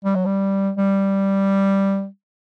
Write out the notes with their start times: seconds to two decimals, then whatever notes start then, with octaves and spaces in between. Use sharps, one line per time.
0.04 G3
0.15 F#3
0.25 G3
0.77 G3